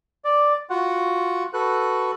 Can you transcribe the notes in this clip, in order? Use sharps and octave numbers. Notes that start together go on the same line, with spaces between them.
D5
F4 F#4 F#5
F#4 A4 B4 F#6